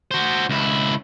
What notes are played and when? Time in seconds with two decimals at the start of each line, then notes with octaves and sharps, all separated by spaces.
0.11 F#4 C5
0.50 C#2 E4